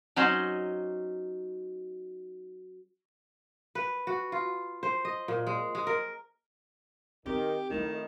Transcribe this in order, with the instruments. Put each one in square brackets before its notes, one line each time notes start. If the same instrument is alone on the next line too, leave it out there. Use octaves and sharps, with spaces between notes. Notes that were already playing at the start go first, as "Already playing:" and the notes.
[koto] F#3 C#4 D#4 C5
[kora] B4
F#4
F4
C5
D#5
A#2
G#3
G#3
A#4
[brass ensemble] D#3 [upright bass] C4 [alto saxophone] G4
[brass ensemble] F2 A2 D#4 [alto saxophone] D#3 [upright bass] A3 E4